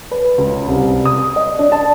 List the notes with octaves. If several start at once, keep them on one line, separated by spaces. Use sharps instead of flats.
B4
C#2
C2
D#6
D#5
D4
A5